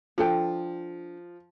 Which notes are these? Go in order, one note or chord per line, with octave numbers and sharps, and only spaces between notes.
F3 D4 A4 G5